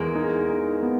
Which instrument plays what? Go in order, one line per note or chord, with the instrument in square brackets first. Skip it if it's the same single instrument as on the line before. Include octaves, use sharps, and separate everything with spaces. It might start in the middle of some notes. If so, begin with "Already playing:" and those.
Already playing: [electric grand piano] E2 [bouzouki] G#3 A#3
[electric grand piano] D#4
D#4
B3